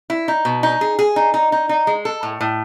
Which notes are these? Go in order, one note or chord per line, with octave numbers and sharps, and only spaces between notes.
E4
D#4
B2
D#4
G#4
G#4
D#4
D#4
D#4
D#4
G#3
A4
A2
A2